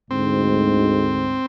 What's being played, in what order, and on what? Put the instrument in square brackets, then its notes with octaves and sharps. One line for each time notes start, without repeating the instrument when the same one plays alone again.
[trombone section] D2 G#2 [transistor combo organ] C4